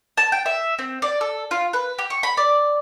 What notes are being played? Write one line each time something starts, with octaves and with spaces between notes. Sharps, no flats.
A5
G5
E5
C4
D5
A4
F4
B4
G4
C#6
B5
D5